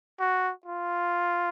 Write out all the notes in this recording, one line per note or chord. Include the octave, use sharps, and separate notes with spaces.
F#4
F4